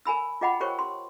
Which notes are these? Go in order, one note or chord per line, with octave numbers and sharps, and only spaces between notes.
A#4 G#5 B5 E6
F4 G#4 D#5 F#5 G5 B5
G4 A#4 C5 C#5 G5 C#6
C6